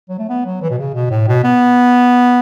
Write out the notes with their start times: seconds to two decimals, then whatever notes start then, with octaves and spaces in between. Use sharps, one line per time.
0.09 F#3
0.19 A3
0.29 B3
0.46 F#3
0.62 E3
0.70 B2
0.79 C#3
0.94 B2
1.10 A2
1.28 B2
1.44 B3